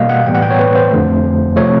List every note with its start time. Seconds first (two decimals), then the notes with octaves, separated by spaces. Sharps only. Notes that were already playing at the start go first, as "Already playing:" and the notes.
Already playing: B2 G3 A#3 D#5 F5
0.09 F#5
0.26 A2 E3 G3 B3 G5
0.35 F#5
0.42 G5
0.50 C#5
0.59 B4
0.75 C5
0.91 F2 D3 F3 A3
1.56 C3 F3 A3 C#5